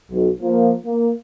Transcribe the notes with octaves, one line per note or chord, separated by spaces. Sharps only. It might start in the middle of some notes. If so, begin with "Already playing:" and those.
B1
F3 A#3
A#3